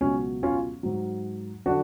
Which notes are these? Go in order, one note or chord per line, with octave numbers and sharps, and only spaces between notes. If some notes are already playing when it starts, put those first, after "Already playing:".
C#2 B2 F#3 C#4
C#4 F4
G#2 F#3
D3 F#3 D4 F#4